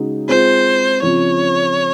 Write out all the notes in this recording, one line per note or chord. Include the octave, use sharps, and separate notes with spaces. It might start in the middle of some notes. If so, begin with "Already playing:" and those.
Already playing: C#3 G#3 D#4 F#4
G#3 C4 F4 C5
C#3 F3 C4 F4 C#5